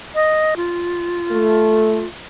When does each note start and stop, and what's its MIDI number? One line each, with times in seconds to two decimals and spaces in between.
0.15 0.55 75
0.57 2.08 65
1.31 2.03 57